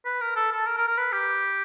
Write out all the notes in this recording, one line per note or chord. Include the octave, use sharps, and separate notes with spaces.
B4
A#4
A4
A4
A#4
A#4
A#4
B4
G4